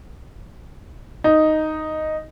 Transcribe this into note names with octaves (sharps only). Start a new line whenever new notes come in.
D#4